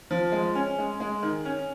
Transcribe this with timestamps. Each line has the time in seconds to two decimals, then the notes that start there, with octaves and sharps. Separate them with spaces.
0.11 F3
0.32 G#3
0.55 C#4
0.78 G#3
1.00 G#3
1.23 D#3
1.45 C#4